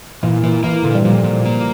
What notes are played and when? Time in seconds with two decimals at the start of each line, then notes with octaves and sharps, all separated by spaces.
0.23 A#2 E3
0.43 E3 A#3
0.63 E3 A#3
0.83 A#2 D3
0.95 G3
1.04 A#2 F3
1.24 A#2
1.46 A#3